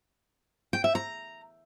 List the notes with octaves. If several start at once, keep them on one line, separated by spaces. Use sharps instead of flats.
G5
E5
A#5